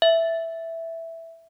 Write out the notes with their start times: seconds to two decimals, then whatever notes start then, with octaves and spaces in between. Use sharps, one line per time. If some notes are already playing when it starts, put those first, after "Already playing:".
0.02 E5